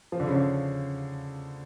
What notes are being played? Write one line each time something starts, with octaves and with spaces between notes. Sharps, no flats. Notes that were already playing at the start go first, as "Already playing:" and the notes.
F3
D3
C#3
D3